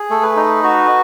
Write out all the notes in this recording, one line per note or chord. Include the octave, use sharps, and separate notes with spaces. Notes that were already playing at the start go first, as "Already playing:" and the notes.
Already playing: G#4
A3 A4
B4
D#4
F#4